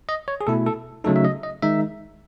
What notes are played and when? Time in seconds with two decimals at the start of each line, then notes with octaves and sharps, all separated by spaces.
0.09 D#5
0.28 C#5
0.41 G#4
0.47 B2 A3 E4 A4
0.67 A4
1.04 C#3 F#3 A3 D#4 A4
1.16 E5
1.25 D#5
1.43 D#5
1.62 D#3 G#3 D#4 E5